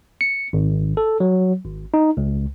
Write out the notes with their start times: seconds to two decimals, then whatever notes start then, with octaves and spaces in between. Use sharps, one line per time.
0.21 C#7
0.53 G#1
0.97 A4
1.20 F#3
1.65 G#1
1.94 D#4
2.17 C#2